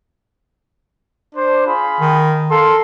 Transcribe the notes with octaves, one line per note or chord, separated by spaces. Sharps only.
D4 C5
F4 G#4 B5
D#3
A4 A#4 F5 C6